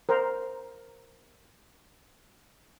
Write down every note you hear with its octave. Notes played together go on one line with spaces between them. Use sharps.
A#4 C5